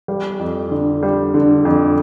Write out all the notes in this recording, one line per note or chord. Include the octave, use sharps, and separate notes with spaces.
G3
F2
D3
G3
D3
F2